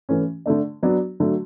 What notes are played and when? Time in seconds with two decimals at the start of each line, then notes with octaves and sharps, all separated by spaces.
0.09 E3 A3 C#4
0.46 D3 A3 D4
0.83 F#3 B3 D4
1.20 D3 F#3 A3